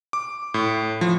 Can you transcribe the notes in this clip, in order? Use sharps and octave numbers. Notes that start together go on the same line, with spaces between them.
D6
A2
F3